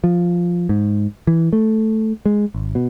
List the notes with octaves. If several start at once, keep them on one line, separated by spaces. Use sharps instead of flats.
F3
G#2
E3
A3
G#3
G#1
B2